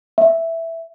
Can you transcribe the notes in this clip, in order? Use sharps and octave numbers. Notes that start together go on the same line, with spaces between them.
E5